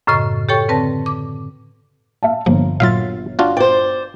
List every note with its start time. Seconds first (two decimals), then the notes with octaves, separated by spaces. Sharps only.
0.07 F#2 A2 C#3 D#5 C#6
0.49 G4 A4 C#5 G5 C#6
0.69 D3 C4 B4 A5 A#6
1.06 D6
2.23 E5 F5 A5
2.46 G1 F3 A#3
2.80 A#2 F#3 F4 E5 F5 A6
3.39 D4 F4 F#4
3.57 C5 D5 G5